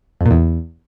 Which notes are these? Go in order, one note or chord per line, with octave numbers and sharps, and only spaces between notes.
F2
A#2
E2